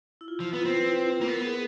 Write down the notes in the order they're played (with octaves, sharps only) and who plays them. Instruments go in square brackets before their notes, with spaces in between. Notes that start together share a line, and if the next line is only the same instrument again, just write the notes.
[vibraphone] E4
F4
[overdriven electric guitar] F3 [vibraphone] E4
[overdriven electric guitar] B3 [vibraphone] F4
[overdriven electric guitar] C4 [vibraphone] B4
[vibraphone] B4
[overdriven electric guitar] A#3
[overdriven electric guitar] B3 [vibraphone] A#4
[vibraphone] G#4